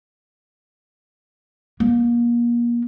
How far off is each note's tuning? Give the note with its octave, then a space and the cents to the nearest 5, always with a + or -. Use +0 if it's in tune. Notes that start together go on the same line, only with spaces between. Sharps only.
A#3 +30